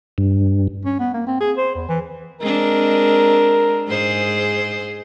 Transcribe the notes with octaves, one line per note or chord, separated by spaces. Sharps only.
G2
C#4
B3
A#3
C4
G#4
C5
E2
E3
G#3 C4 D4 A#4
G#2 G#4 C5